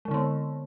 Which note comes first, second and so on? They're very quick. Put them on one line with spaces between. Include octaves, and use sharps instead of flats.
G#3 D3 C4 B3